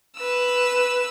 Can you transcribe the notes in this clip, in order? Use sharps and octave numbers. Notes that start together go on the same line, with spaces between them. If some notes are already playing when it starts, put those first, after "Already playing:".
B4 E6